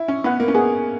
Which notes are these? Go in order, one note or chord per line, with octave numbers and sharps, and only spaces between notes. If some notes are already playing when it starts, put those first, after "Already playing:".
Already playing: E4
C#4
B3 B4 F#5
A#3
C#4
B3 G#4